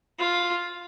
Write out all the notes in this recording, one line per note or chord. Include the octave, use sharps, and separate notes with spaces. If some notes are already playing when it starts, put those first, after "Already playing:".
F4